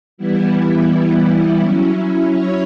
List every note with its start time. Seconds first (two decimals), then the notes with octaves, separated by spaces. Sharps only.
0.18 E3 G3 B3 E4
1.60 F#3 C#4 E4
2.32 C#5